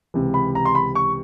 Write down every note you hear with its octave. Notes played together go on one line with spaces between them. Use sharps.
C#2 C3 E3
B5
A#5
C6
B5
C#6